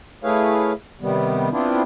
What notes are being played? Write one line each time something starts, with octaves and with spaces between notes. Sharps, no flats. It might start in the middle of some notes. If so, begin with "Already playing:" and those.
A3 E4 G#4 B4 C#5 F5
C3 D#3 G3 B3
B3 C4 D4 E4 F4